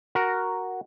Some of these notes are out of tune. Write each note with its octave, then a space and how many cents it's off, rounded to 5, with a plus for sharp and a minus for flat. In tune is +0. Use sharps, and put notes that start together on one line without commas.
F#4 +0 A#4 +0